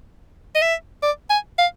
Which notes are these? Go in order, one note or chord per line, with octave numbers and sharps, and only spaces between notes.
D#5
E5
D5
G#5
F5